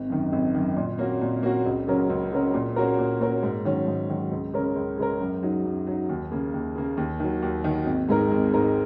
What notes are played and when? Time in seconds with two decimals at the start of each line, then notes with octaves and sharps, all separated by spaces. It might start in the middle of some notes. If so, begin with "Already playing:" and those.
Already playing: G#1
0.10 F#2 D#3
0.32 G#1
0.54 F#2 D#3
0.76 A#2
0.98 A#3 C#4 F#4
1.21 A#2
1.43 A#3 C#4 F#4
1.65 C#2
1.88 C#3 F#3 C#4 A#4
2.10 C#2
2.32 C#3 F#3 C#4 A#4
2.54 A#2
2.76 A#3 C#4 F#4 A#4
2.98 A#2
3.20 A#3 C#4 F#4 A#4
3.43 G#2
3.65 D#3 F#3 C#4
3.87 G#2
4.10 D#3 F#3 C#4
4.32 C#2
4.53 C#3 G#3 C#4 A#4
4.75 C#2
4.98 C#3 G#3 C#4 A#4
5.21 F#2
5.43 F#3 D#4
5.65 F#2
5.87 F#3 D#4
6.09 D#2
6.31 C#3 A#3
6.54 D#2
6.76 C#3 A#3
6.97 D#2
7.20 D#3 F#3
7.42 D#2
7.64 D#3 F#3
7.86 G#1
8.09 G#2 G#3 D#4 A#4
8.31 G#1
8.53 G#2 G#3 D#4 A#4